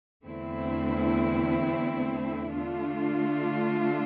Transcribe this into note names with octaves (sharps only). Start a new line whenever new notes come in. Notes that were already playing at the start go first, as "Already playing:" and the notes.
E2 D3 A3 C4 E4
D3 A3 D4 F4